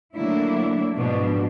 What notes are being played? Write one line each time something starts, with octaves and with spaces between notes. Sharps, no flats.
D3 F#3 A3 A#3 D4 E4
G#2 B2 F3 D4